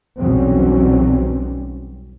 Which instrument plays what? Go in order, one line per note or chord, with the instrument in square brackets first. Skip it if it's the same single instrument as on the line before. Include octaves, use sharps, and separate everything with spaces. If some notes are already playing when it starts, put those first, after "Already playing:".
[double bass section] B1 E2 F#3 G3 C4 C#4